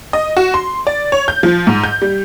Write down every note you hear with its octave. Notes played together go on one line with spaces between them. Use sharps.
D#5
F#4
C6
D5
C#5
G6
F3
G#2
G6
G3